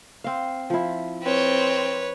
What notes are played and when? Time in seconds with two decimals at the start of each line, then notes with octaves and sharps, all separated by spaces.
0.24 C4 F5
0.70 F3 E4
1.23 C4 B4 C#5